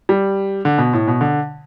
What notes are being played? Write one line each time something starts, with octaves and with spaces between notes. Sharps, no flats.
G3
D3
B2
A2
B2
D3